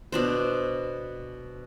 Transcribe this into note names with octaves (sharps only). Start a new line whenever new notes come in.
B2 D4 C5